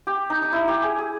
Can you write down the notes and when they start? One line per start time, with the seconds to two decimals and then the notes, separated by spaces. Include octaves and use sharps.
0.07 G4
0.30 D#4
0.42 D#4
0.52 E4
0.68 G4
0.83 G#4
0.98 G#4